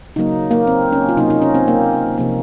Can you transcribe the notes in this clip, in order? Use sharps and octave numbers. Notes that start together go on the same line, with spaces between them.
C#3 F#3 A#3 D#4
A#3
C4
C#4
F4
C3 F#3 A#3 D#4
D#4
C#4
C4
A#3
C3 F3 A#3